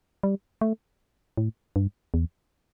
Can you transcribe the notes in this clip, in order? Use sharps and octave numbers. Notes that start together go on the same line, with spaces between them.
G3
A3
A2
G2
E2